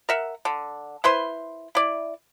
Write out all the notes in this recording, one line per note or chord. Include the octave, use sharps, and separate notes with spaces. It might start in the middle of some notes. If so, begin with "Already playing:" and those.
A#4 E5 F#5
D3
E4 B4 C5 C6
E4 D5